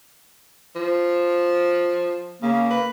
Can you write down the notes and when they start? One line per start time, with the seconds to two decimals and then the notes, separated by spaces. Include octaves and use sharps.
0.76 F3
2.42 C#3 A#3
2.70 B4